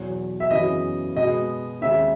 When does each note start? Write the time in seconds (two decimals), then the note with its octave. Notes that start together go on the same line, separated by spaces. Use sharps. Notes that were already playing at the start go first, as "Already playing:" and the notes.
Already playing: E2 B2 F#3
0.40 E5
0.50 F#2 C#3 E3 B3 D#5
1.16 B2 G#3 B3 D#5
1.81 D#2 C#3 G#3 E5